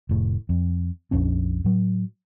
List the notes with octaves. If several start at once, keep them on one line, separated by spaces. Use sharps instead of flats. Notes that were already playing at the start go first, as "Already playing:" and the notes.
F1 A2
F2
A#1 F2 C#4 D4
A2 F#3